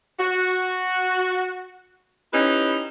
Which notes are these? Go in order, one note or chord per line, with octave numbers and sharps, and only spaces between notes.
F#4
C#4 D#4 E4 G4 B4